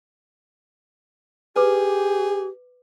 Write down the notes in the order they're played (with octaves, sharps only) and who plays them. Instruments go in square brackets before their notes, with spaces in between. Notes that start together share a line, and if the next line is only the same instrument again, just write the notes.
[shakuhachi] G4 [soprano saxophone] G#4 [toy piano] B4 D6